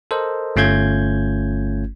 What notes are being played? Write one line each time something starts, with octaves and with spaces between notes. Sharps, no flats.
A4 A#4 C5 D#5
G1 A3 C#4 F4 G6 G#6